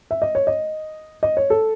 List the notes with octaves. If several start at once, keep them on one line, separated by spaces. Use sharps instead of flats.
E5
D#5
C#5
D#5
D#5
C#5
A4